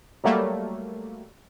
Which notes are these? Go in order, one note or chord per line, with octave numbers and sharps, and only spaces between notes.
F#3 G3 A3 A#3